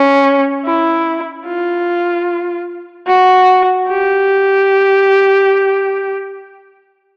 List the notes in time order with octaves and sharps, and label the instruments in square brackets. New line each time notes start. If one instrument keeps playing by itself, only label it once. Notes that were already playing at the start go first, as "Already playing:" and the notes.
Already playing: [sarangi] C#4
E4
F4
F#4
G4